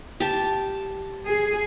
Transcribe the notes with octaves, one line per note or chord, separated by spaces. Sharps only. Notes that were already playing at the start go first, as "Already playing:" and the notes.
G4 A5
G#4